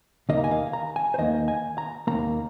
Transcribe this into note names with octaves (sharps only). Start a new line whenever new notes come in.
D#2 D#3 A#3 D#5
A#5
G#5
F5
A#5
G#5
C5
D#2 D#3 A#3 D#5
G#5
A#5
D#2 D#3 A#3 A#5